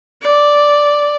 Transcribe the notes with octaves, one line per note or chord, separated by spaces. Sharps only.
D5